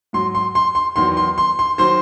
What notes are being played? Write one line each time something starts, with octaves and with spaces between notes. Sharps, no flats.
G#2 F#3 C6
C6
C6
C6
E2 D#3 F#3 C6
C6
C6
C6
D#3 F#3 C5 C6